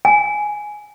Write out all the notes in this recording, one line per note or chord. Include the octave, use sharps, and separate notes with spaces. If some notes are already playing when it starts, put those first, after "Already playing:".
G#5